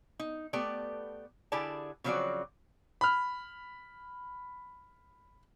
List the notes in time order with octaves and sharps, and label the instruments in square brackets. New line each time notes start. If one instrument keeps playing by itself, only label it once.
[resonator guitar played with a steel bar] D#4
A3 B3 G4 A4 D5
D3 E4 G4 G#4 D5 A5
C#3 F3 F#3 C4 F#4 D5
[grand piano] B5 F6